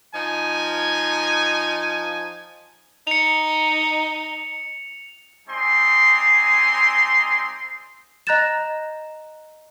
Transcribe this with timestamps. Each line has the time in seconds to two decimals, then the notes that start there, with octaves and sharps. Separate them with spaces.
0.13 F3 D#4 G#5
3.07 D#4 C#7 F7
5.48 G3 C4 D#4 G#5 C6
8.27 D#5 A#5 F#6 G6 A6 E7